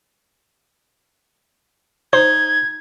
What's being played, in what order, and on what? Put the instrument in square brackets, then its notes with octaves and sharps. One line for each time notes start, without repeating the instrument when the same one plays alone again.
[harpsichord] D#4 [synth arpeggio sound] C5 [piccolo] G#6